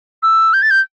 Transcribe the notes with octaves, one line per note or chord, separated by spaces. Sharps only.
E6
G6
A6
G6